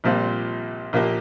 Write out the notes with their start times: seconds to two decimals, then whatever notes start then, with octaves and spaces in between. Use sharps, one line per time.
0.04 A#1 A#2 G3 C4 F4
0.93 A#1 A#2 A#3 G4